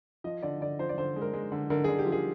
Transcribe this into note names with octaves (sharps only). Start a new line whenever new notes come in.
F3 D#5
D3 D5
D3 D5
F3 C5
D5
D3 C5
G#3
A#4
G#3
D3
D3 A#4
D3 G#4
G4
F3
G#4